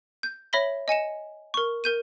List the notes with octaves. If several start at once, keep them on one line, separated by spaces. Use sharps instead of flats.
G6
C#5 E5 B5 A#6 B6 G7
D#5 G#5 C#7 E7
A#4 C#6
A#4 G6 D#7